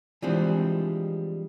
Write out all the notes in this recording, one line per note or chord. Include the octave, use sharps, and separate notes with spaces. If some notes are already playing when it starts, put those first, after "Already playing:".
E3 F3 G3 G#3 C4 D4